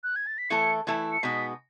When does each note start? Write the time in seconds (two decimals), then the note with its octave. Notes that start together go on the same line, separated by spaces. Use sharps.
0.04 F#6
0.16 G#6
0.27 A6
0.38 B6
0.50 E3 A3 E4 A4 C#7
0.87 E3 A3 E4 A4
1.12 C#7
1.23 B2 G#3 B3 D#4 B6